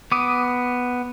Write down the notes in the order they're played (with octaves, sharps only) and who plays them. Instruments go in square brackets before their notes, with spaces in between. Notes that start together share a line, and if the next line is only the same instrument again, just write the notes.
[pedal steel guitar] B3 D6 D#6